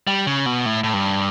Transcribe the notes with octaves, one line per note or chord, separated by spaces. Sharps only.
G3
C#3
B2
A2
A2
G2